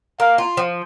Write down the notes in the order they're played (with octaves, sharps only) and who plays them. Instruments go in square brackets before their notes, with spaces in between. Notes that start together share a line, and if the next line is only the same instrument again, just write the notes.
[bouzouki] A#3 [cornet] F5
[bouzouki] F4
F3